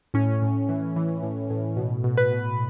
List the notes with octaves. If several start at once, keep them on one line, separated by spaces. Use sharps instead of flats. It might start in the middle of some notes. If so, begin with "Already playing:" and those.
A2 C#4
A2
E3
E3
A2
A2
B2
B2
B4
B2